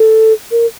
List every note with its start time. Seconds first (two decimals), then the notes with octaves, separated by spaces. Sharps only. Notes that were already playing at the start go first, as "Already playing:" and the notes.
Already playing: A4
0.51 A#4